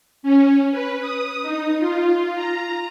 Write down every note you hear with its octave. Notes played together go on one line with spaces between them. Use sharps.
C#4
B4
D#6
D#4
F4
A#5